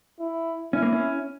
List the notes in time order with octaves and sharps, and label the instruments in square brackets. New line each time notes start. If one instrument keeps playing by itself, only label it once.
[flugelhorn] E4
[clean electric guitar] C#4 [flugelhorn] E4
[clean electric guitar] A#3
C#4